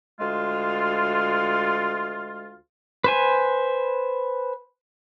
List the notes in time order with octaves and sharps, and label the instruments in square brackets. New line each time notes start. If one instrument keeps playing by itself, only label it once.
[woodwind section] D2 G#3 F4
[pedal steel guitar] B4 C5 G#5